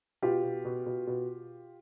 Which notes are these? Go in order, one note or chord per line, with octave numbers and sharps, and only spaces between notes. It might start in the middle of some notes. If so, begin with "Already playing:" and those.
B2 F4 G4
B2
B2
B2
B2